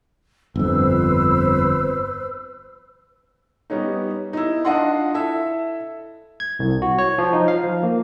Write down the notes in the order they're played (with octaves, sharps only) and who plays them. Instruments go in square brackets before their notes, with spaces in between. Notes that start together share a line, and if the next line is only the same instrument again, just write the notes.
[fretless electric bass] G1 F2 [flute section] B4 C5 E6
[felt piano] G3 B3 C#4 D#4
D#4 E4
D4 F4 D#5 F#5 C6
E4 A4 E5
[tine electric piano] G#6
C2
F#4
C#5
F3
D#4
F5
F3
A#3